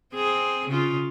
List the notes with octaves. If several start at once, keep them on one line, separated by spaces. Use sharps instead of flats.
C4 G#4
C#3 F4